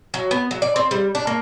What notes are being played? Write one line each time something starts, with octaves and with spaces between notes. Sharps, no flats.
F#3
B3
F#3
D5
C4
G3
D4
A#3